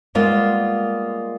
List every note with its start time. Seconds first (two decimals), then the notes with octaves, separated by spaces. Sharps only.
0.15 G3 G#3 A#3 B3 F4